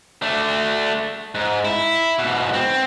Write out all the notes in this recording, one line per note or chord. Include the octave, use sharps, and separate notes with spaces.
A3 D4
G#2
E4
G#2 B2
C4